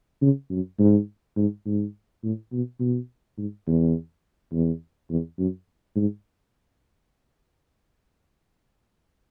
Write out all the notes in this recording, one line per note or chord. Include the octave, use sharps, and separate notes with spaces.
C#3
F#2
G#2
G#2
G#2
A2
B2
B2
G#2
E2
E2
E2
F#2
G#2